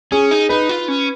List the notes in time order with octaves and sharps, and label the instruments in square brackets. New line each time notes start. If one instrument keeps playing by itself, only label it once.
[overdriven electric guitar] C#4 [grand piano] G#4
[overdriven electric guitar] D#4
[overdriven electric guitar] D#4 [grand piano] B4
[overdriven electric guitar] F4
C#4